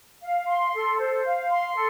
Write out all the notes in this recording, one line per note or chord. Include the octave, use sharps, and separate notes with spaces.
F5
C6
A4
C5
F5
C6
A4